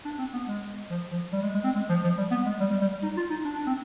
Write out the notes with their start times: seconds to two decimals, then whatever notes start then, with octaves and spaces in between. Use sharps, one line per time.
0.05 D4
0.18 C4
0.33 B3
0.47 G#3
0.90 F3
1.11 F3
1.32 G3
1.42 G#3
1.54 G#3
1.64 C4
1.75 G#3
1.89 F3
2.04 F3
2.18 G3
2.31 B3
2.46 G#3
2.60 G3
2.71 G3
2.81 G3
2.92 G3
3.03 D#4
3.17 F4
3.30 D#4
3.45 D4
3.55 D4
3.67 C4